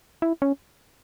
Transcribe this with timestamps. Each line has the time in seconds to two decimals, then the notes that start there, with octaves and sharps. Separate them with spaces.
0.22 E4
0.42 C#4